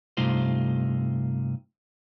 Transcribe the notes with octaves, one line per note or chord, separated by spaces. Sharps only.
G2 C3 A3 D#4 F4 C5